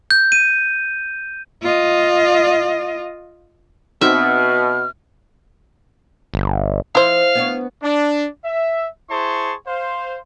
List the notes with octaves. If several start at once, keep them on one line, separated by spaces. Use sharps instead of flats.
G6
D#7
F4 D#5
B2 C4 D#4 F#4 E5 F6
G1
F3 E4 C5 F5
B3 D4 C#5
D4
E5
E4 G#4 C5 A5 C6 C#6
C5 F5 C6